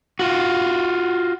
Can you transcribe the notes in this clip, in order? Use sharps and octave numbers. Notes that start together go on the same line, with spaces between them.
F4 F#4